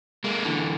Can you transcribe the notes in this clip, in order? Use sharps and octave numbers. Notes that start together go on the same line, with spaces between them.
G#3 A#3
D3 E3